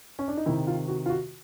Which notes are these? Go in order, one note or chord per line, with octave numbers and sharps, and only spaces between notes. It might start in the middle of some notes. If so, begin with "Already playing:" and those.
C#4
D4
D#4
C3 D#3 E4
F4
F#4
F4
F#4